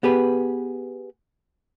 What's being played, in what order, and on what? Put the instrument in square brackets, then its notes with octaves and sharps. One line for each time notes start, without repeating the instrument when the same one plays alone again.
[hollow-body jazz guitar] B3 G4 G#4 B4